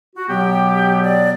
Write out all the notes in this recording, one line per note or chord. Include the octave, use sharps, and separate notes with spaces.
F#4
B2 F#3 B3 G4
D5